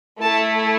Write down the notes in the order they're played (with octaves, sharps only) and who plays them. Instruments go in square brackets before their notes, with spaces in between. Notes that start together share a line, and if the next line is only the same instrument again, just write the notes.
[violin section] A3 E4 A4 A5